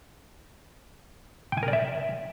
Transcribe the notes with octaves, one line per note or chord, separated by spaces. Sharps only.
G5
G#5
A#4
D5
E5